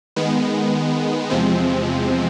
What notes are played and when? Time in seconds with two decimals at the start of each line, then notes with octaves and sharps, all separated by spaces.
0.16 D#3 G#3 B3
1.30 E2 C3 F3 G#3 C4